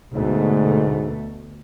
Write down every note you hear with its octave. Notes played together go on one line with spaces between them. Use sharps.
D2 G#2 B2 A3